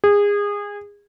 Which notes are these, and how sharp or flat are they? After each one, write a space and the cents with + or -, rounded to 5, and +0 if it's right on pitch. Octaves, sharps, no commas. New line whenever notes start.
G#4 -25